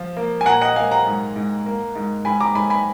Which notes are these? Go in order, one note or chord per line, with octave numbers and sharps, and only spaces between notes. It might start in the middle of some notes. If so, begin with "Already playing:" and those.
Already playing: F3
A#3
G#5
A#2 F#5 A#5
D#5 F#5
A#3 F5 G#5
F#5 A#5
G#2
G#2
A#3
G#2
G#2 G#5 B5
A#5 D6
G#2 G#5 B5
G#5 B5